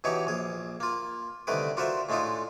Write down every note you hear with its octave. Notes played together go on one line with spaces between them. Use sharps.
B2 E3 D#4 G4 C#5
A#1 G#4
A#3 F4
C2 D3 D#3 A3 B4 D6
D4 F4 F#4 A#4 C5 E5
A2 G#3 A3 D4 D#4 F4